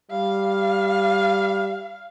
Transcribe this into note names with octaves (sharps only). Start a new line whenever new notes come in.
G3 F5